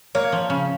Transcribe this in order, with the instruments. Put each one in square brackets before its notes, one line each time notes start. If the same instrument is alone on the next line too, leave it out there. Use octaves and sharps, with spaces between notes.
[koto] A#3 [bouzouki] C#5 F5
[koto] F3
C#3